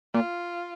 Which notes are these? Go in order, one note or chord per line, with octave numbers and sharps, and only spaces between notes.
A#2 F4